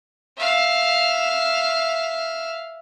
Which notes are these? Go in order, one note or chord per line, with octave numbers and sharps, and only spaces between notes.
E5 F5